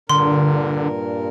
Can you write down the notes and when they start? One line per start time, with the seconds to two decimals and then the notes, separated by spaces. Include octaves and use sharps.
0.09 G2 A#2 D3 A#4 C6